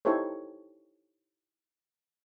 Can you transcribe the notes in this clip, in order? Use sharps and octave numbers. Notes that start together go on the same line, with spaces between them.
D#4 E4 G4 A4 C5 C#5